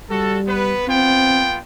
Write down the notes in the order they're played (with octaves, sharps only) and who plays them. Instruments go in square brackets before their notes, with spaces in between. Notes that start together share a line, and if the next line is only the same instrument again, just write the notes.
[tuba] G3 [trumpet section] F#4 A4
[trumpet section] B3 B4
[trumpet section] B3 F4 G5 [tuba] C4